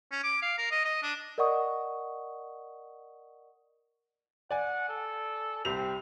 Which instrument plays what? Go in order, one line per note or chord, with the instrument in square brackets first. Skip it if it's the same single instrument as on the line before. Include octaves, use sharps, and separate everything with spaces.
[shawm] C#4
D6
F5
A#4
D#5
D#5
D4
[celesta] A#4 D5 D#5 F#5 C#6 D#6
[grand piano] D5 G#5 [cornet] F#5
[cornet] A4
[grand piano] C2 G4 F7 [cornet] C4